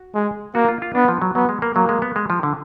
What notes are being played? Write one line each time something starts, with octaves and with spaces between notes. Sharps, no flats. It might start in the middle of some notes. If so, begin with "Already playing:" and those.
Already playing: F#4
G#3
A#3 F#4
F4
F4
B3 D4
F3
F#3
F#3 B3
G#3
A#3
F#3 A#3
G#3
B3
G#3
F3
D3